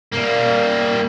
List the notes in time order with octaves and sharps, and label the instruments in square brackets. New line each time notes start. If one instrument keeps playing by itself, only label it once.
[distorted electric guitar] G3 A#3